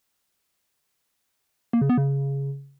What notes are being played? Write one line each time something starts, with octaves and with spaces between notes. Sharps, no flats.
A#3
C#3
B3
C#3